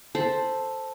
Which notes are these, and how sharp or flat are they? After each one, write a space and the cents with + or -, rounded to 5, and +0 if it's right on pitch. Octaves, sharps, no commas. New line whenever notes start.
A4 +0 C5 +0 B5 -15